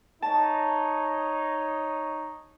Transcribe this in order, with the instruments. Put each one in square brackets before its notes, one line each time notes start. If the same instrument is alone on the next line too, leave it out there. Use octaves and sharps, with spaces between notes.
[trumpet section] D#4 C#5 [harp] A5